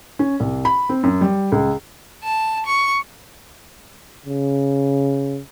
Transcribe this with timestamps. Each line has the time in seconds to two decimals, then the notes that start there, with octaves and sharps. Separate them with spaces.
0.19 C#4
0.40 C2
0.65 B5
0.89 C4
1.03 F#2
1.21 G3
1.52 C#2
2.24 A5
2.66 C#6
4.26 C#3